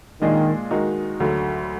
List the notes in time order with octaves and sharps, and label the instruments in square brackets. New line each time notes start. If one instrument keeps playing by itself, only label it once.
[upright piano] A#2 G#3 D4 G#4 D#5 [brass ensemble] D#3
[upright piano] D#3 G#3 D#4 F#4
D2 D3 F#3